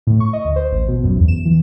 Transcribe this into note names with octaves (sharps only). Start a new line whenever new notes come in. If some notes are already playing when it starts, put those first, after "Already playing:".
A2
C#6
D#5
D2
C5
A1
B2
F#2
E2
E7
E3